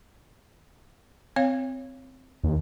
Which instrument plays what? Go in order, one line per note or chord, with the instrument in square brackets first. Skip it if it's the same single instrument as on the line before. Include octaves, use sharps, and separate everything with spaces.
[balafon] C4 C#5 F5
[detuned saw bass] D#2